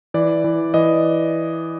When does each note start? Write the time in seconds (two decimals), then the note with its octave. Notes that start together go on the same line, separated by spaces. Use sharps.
0.14 E3 D5
0.44 E3
0.74 E3 D#5